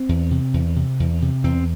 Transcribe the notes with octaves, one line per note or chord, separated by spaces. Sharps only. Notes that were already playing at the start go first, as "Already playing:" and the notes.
Already playing: C4
E2
C3
E2
C3
E2
C3
E2 C4